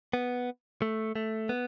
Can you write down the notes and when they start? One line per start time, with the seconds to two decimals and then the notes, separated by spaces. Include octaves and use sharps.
0.13 B3
0.82 A3
1.16 A3
1.49 B3